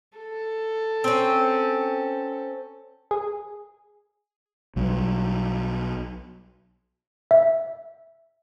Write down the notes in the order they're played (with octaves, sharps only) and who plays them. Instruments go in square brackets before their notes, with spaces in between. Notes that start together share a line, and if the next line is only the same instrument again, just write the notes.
[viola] A4
[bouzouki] C4 C#4
[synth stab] G#4
[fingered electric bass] B1 F#3 G3
[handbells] E5